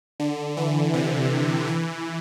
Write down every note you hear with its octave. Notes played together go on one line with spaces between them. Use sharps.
D3
E3
C3
E3